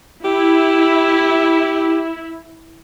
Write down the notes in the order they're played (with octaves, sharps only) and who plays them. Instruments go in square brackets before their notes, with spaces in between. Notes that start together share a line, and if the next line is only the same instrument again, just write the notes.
[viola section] E4 [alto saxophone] G4